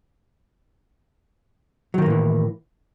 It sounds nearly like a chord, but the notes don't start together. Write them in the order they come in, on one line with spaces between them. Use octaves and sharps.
F#3 D#3 A#3 A2 E3